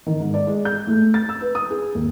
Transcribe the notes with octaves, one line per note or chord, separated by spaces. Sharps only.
D#3
G#2
D5
G#3
G6
A3
A6
E6
B4
D#6
G#4
D#2